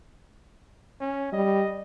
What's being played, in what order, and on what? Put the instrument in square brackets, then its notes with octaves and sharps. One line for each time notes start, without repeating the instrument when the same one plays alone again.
[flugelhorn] C#4
[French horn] G3 [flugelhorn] D#5